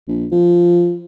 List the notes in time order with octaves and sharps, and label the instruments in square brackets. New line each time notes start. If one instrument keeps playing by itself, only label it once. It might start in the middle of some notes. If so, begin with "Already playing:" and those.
[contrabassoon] A#1
F3